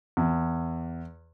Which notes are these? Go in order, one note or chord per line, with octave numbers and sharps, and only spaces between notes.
E2